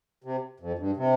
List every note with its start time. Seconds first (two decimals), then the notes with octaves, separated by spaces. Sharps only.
0.24 C3
0.60 F2
0.79 G2
0.96 C3